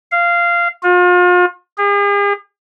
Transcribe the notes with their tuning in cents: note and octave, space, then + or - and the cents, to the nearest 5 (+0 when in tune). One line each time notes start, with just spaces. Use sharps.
F5 -15
F4 +40
G#4 -45